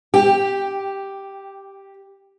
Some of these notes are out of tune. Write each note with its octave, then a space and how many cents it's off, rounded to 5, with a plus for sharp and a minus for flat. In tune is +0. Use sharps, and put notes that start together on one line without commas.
G4 +0 G5 +20